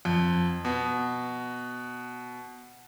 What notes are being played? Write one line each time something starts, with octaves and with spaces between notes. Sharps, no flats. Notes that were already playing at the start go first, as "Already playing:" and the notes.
F2
B2